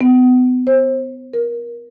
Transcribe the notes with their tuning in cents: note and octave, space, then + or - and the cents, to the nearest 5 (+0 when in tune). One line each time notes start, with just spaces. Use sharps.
B3 +35
C5 +30
A#4 +20